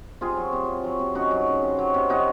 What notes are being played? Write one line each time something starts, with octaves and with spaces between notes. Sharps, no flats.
C3 F4 G#4
F#3
C3
C3
F#3
C3
C#3 D#4 F#4
F#3
C#3
C3
F#3
C3
C3 D#4 F#4